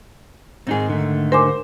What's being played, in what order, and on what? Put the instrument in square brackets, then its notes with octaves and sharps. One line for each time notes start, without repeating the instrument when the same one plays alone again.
[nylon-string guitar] G#2 D#3 [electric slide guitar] C4 D#4 G#4
[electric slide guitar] D3 A3
[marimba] A#4 G#5 D6 [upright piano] C5